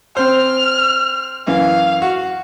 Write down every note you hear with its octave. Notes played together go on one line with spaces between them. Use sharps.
C4 C5 F6
F#2 E3 F5
F#4